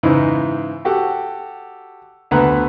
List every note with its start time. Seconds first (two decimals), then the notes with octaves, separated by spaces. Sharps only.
0.03 G#2 C#3 E3 D#4 E4
0.85 F#4 G4 A4 F#5
2.31 D2 A3 B3 B4 F#5 A#5